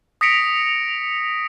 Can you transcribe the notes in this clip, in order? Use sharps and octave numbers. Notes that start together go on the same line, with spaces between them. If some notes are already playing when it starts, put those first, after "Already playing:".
D#6 A#6 B6 C#7 D7 F7